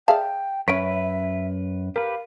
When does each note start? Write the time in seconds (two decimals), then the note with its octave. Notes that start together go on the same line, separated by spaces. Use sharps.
0.08 G#4 D5 E5 F5 G5 A5
0.68 F#2 C#4 B4 C#5 E5 B6 D7
1.96 G4 A#4 B4 F5